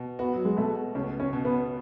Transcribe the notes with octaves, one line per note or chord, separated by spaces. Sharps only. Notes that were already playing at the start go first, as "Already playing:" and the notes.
Already playing: B2
B3 F#4
F#3
G#3
B2 A3
C#2 C#4
C#4
B2
B3